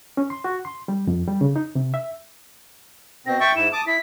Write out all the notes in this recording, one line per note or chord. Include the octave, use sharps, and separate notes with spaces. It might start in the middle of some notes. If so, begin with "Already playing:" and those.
C#4
C6
F#4
C6
G3
F2
G3
C#3
D#4
C3
E5
B2 C4 A#6
E5 G5 C#6 A6
G#2 E4 E7
A5 D6 D#6
E4 B6